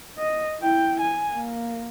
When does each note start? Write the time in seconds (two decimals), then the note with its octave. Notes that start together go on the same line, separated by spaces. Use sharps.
0.18 D#5
0.60 E4 G5
1.01 G#5
1.33 A#3